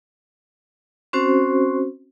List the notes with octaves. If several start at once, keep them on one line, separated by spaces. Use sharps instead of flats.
C4 C#4 F#4 C5